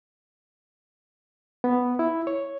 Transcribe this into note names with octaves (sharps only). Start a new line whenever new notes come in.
B3
E4
C#5